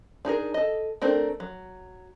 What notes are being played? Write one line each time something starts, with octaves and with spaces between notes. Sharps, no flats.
D4 D#4 G#4 A#4
A4 D#5
A3 C4 D4 A#4
F#3